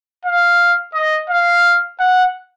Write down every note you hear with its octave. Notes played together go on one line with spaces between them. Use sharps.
F5
D#5
F5
F#5